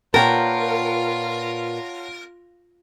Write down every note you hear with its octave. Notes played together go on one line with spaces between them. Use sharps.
A#2 F4 A#4 B4 C#5 F#5 G5 A5